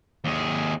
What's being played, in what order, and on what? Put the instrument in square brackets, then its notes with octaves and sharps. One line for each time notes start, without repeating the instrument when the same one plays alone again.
[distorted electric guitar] D#2 G#4